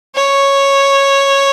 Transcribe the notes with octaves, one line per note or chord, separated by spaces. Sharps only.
C#5